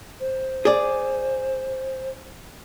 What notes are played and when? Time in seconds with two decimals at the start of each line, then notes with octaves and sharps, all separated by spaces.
0.20 C5
0.65 G#4 D5